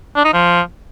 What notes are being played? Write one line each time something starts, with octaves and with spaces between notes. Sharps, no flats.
D4
D#4
F3